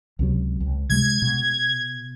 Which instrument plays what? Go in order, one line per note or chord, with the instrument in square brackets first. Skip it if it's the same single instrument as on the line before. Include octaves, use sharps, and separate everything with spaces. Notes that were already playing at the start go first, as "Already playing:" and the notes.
[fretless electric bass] C#2 C3 F#3
C#2
[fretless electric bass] C3 G3 G#3 [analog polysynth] G#6
[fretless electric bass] B2